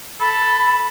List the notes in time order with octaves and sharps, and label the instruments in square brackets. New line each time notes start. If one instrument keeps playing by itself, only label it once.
[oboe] A4 [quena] B5